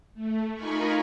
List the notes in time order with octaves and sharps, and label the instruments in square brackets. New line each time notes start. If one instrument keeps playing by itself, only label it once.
[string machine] A3
D#4 F4 A#4 G#5 B5 C#6